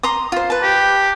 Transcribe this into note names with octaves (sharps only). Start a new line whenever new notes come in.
A#5 C6 D#6
F4 C5
B4 A5
G4